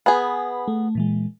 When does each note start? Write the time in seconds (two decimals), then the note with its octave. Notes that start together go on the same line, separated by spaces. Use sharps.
0.06 B3 G#4 B4 G#5 B5
0.68 A3
0.95 A#2 E3 G#3